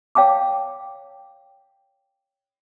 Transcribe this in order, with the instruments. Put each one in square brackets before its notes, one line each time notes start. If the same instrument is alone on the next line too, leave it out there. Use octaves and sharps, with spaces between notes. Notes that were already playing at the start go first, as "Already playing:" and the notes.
[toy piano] C#5 F5 G5 A5 D6